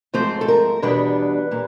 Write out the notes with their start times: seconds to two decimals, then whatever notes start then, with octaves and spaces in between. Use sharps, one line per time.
0.14 G#2 F3 A3 C4 C5
0.41 A4
0.48 A#4
0.82 E2 B2 G3 B3 D4 B4
1.51 A#2 G3 A#3